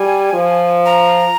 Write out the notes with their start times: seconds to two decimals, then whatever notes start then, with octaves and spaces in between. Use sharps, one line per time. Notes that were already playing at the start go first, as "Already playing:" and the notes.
Already playing: G3 G#5
0.33 F3
0.85 A#5